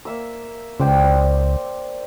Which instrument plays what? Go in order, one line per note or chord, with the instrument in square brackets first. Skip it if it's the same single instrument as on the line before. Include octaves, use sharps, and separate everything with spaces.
[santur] A#3 E5 E6
[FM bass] C#2 [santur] C5 D5 G5